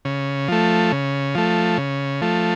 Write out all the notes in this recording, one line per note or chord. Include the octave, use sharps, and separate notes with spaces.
C#3
F3 A3
C#3
F3 A3
C#3
F3 A3